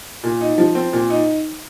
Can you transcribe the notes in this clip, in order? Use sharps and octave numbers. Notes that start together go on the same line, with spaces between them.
A#2
D#4
F3
C4
A#2
D#4